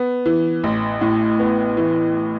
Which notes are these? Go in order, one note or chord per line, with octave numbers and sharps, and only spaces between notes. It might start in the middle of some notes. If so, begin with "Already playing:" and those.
Already playing: B3
E3
A1
A2
B3
E3